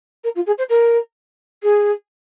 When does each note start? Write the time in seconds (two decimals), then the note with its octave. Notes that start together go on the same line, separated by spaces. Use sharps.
0.24 A#4
0.35 F4
0.46 G#4
0.58 C5
0.69 A#4
1.63 G#4